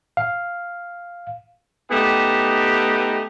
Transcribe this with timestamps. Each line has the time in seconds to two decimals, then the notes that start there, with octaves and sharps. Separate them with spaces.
0.17 F5
1.91 A3 B3 D#4 G4